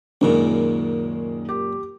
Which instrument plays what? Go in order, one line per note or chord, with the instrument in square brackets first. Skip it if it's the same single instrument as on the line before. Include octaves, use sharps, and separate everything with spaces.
[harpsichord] C#2 F#2 A#2 [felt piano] D#3 G#3
[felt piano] G4